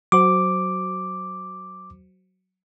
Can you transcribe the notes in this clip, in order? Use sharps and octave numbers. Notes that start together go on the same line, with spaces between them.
F#3 F#4 C5 D6